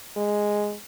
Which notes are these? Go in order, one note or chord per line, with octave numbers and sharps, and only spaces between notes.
G#3